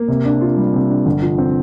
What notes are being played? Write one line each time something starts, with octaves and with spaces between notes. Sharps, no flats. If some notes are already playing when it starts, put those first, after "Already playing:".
Already playing: A#3
C3
D4
F4
G3
C3
D4
G1
F3
C4